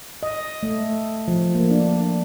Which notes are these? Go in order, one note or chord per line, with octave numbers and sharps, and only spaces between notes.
D#5
A3
F3
A#3
D4